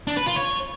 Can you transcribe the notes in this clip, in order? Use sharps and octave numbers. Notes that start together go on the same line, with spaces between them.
D4
B4
F4
C#5